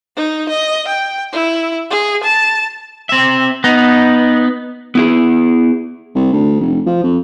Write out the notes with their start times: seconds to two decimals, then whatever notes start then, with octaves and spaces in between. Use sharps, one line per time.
0.16 D#4
0.49 D#5
0.88 G5
1.32 E4
1.90 G#4
2.23 A5
3.09 C4 E5
3.64 B3 D#4
4.95 B3 E4 G#4
6.15 C2
6.33 D2
6.60 F1
6.87 F3
7.03 F2